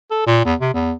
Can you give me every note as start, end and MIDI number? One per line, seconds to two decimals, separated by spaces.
0.11 0.25 69
0.27 0.41 46
0.45 0.55 40
0.60 0.73 48
0.74 0.93 40